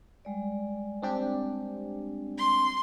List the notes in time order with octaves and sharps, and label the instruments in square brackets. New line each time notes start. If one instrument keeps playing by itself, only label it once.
[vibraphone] G3 G#3 D5
[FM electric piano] C4 D4 G4
[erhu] C6